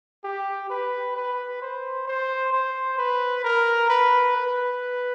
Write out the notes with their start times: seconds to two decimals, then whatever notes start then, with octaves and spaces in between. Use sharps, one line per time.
0.24 G4
0.70 B4
1.16 B4
1.62 C5
2.08 C5
2.53 C5
2.98 B4
3.44 A#4
3.90 B4
4.36 B4